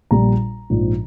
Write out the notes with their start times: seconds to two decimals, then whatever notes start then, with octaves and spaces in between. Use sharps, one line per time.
0.11 A#1 A#2 G3 A#5
0.70 A#1 G#2 F3